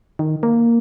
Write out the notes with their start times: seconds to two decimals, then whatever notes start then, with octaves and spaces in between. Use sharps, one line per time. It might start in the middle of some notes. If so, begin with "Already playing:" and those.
0.19 D#3
0.43 A#3